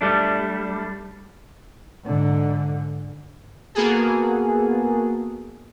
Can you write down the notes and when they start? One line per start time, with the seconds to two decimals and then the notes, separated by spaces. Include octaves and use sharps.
0.01 G3 A3 D4
2.05 G#2 D3
3.75 A#3 B3 F#4 G#4 A4